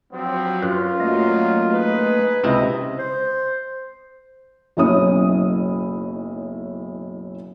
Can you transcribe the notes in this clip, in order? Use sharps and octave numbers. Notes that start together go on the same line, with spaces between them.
G2 F3 F#3 C4
F#2 F4 B4
A#2 F#3 A3 A#3 D#5
D#4 G#4 B4
C#2 C3 E4 D#5
C5
F#1 B1 C#4 E4 C#5 D#6